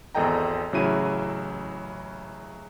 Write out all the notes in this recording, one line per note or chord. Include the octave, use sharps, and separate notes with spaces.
G#1 E2 A4 D#5 G5 A#5
A1 C#3 F#3 E4 D#7